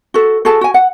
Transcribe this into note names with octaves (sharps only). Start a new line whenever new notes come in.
F#4 A4
F#4 G#4 A4 A5
F#4 G#5
F#5